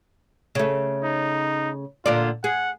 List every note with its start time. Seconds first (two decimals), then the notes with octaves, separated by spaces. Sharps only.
0.55 C#3 A3
1.03 D#4
2.06 A#2 D3 F4 D5
2.44 G#4 F#5